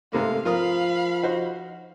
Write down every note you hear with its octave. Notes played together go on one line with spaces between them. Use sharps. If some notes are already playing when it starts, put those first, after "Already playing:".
G#2 C3 A3 A#3 F5
F3 F4 A#4 F5 B5 D#6
D#4 F#4 C5